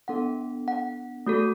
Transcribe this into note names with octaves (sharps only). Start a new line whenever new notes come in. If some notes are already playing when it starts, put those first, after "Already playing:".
B3 D4 A4 F#5
F#5
A3 F#4 A4